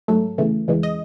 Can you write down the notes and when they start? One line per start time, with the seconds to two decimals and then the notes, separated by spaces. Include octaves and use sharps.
0.08 G#2 F#3 A3 A4
0.38 E2 C#3 E3 A3
0.68 E2 C#3 E3 G#3
0.83 D#5